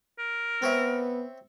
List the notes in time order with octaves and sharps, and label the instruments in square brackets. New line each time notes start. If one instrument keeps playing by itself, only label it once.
[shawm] A#4
[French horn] B3 [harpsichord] C4 C#5 E5